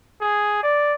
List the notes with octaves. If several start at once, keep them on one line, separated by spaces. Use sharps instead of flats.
G#4
D5